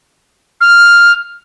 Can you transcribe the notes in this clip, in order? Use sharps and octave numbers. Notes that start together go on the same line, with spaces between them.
F6